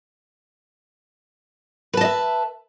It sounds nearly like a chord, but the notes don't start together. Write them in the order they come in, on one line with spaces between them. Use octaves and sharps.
B4 A5 D#5 E5